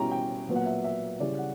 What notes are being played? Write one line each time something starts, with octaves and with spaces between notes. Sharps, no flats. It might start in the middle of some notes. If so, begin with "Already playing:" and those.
Already playing: B2 G3 C#4 E4 G5 A#5
G5
A#2 F#3 B3
F#5
E5
E5
C#3 G3 C#4 E4 D5
F#5